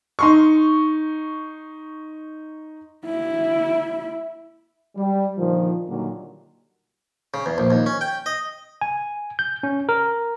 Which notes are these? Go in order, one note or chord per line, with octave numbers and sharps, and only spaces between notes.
D#4 C6 C#6
E4 E5
G3
A#2 D3 D#3 F3
A#2 D3 D#3 F#3 G3 A#3
C#3
E2
A#1
D#2
C#4
G5
D#5
G#5
G6
C#4
A#4